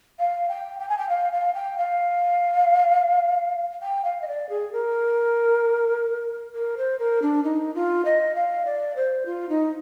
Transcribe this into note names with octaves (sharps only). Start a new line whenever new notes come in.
F5
G5
G5
G#5
G5
F5
F5
G5
F5
G5
F5
D#5
D5
G#4
A#4
A#4
C5
A#4
D4
D#4
F4
D#5
F5
D5
C5
F4
D#4